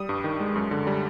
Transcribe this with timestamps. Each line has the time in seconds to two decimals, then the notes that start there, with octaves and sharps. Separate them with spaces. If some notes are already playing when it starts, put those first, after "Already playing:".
Already playing: G3 D#6
0.09 G2
0.24 D#3
0.40 G#3
0.56 F#2
0.71 D3
0.87 G3